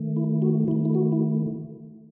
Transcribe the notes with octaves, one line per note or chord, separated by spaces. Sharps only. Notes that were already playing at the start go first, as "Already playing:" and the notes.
Already playing: D#3 A3
E4
F#4
D#3 A3 E4
E4
F#4
E4